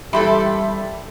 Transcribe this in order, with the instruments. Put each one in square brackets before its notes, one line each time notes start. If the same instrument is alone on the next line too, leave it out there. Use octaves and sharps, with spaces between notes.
[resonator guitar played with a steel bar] E3 G4 A4 [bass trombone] G3 [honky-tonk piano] E5 B5 C6